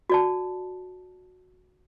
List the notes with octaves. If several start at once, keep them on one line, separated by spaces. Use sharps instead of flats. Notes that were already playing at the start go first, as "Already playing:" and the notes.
F#4 D5 A5